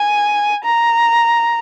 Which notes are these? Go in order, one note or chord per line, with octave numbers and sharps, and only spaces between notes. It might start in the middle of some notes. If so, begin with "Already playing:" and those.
Already playing: G#5
A#5